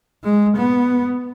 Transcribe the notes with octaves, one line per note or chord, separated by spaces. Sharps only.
G#3
B3